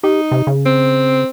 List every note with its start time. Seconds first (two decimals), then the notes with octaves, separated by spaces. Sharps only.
0.04 D#4 G4
0.31 C3
0.47 C#3
0.66 C4